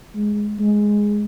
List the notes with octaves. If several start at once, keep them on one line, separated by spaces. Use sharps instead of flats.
G#3
G#3